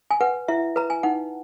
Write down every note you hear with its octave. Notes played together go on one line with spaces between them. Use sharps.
G#5
B4 F#5
E4 E5
B4 A#5
G#5
D#4 F#5